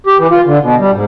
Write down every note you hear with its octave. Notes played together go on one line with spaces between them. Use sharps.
G4
E3
F4
D3
B2
G3
G#2